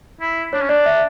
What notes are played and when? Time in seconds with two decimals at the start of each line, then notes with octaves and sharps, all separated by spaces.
0.21 E4
0.53 D4 C#5
0.62 C#4
0.69 D4 D5
0.86 E5